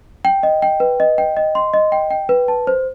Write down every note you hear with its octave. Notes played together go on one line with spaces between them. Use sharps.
G5
D#5
G5
B4
D#5
G5
D#5
C6
D#5
G5
G5
B4
A5
C5